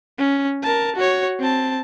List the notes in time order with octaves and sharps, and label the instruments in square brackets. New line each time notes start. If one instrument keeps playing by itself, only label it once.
[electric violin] C#4
A#4 A5
F#4 C#5
C4 A5